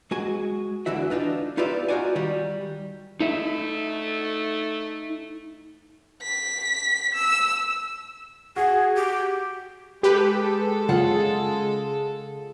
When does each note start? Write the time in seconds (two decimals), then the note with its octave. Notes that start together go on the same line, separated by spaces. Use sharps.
0.11 G#3 F#4 G#5
0.86 D2 D3 E3 F#4 E5
1.10 D4 D#4 F4 B4
1.57 D#4 F4 G4 B4 D5 E5
1.88 D#4 F4 F#4 D5 G#5
2.15 D#3 G3
3.20 A3 D#4 E5
6.23 B6
7.14 E6
8.56 F#4 G#4
8.96 G4
10.03 G#3 G4 A4 B4
10.89 C#3 F4 G#4 F#5